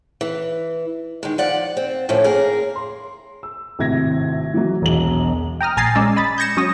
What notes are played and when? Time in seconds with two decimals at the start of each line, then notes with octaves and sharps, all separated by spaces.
0.21 E3
1.23 D#3 G#3
1.38 F3 D5 F#5
1.77 C4
2.09 A2 D3 F3 C#4
2.24 A#3 G#4 A#4
2.76 C6
3.43 E6
3.79 G#1 A2 C3 G#6 A#6
4.54 E3 F#3
4.82 E1 B1 F#7
5.61 G5 A#5 D#6 F6
5.77 A#1 G#5 A#5 A6 C7
5.95 G#3 C#4 D5 D#5 E6
6.16 D#5 B5 A6
6.38 G6 G#6 A#6 C#7 E7
6.57 F#3 C#4 D#6 A#6